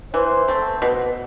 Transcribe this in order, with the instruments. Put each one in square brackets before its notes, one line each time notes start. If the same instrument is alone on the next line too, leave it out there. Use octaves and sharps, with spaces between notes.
[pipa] E3 [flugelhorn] C5
[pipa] A3 C4
B2